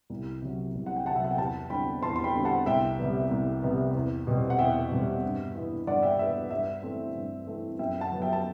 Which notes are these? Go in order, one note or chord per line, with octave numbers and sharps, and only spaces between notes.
C2
C3 F#3
C2
F#5
G5
C3 F#3 F#5 A5
E5
F#5
G5
E2 F#5 A5
D3 G3 C4 G5 B5
E2 A5 C6
C6
G5 B5
D3 G3 C4
F#5 A5
C2 E5 G5
C3 G3 B3
C2
C3 G3 B3
E2
B2 G3 C4
F#5
E2 E5 G5
B2 G3 C4
G2
E3 B3
G2 D5 F#5
E5 G5
E3 B3 E5
G2 E5
E3 A3 C4
G2
E3 A3 C4
F#2 E5 G5
F#5 A5
F#3 B3
E5 G5
A5